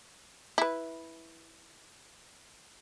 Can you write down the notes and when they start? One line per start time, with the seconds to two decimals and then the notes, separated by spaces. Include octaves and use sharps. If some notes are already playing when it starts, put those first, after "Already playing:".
0.58 E4 B4